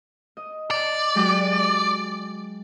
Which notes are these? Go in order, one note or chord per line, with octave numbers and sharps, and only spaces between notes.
D#5
D5
F#3 G#3 G4